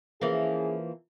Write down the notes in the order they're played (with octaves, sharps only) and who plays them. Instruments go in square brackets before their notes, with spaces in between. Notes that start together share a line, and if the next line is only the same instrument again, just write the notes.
[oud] E3 F3 A#3 [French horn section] C#4 E4 G#4